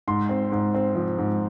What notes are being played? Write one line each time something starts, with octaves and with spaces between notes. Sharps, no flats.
G#2 C6
C4
G#2
C4
F3
G#2